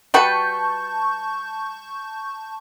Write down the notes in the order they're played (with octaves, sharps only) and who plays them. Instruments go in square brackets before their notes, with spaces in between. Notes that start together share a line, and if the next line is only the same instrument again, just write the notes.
[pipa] G3 F#4 B4 [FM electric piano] A5 C#6 G6